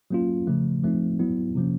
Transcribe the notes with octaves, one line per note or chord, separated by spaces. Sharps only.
F#3 A#3 C#4 F4
C#3 F3 A3
F3 A3 C4 D#4
F#3 B3 E4
C3 F3 A#3 C#4